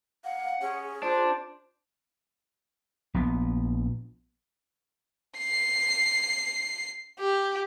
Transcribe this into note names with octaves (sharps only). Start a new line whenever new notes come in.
F5 F#5
C#4 G#4
D4 F4 C5
A#1 B3
C7
G4